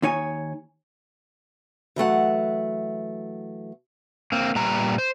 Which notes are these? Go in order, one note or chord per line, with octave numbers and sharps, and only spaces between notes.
D#2 D#4 C#5 G#5
E3 F#3 A3 F#5
A#3 C4
A#2 G3 B4 A#5
C5